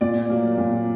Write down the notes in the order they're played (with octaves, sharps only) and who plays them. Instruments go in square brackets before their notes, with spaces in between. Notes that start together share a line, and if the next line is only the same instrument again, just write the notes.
[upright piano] A#2 D5
F#3 A#3
A#2